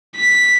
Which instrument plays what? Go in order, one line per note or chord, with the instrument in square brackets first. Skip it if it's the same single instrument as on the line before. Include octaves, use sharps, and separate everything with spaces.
[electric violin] B6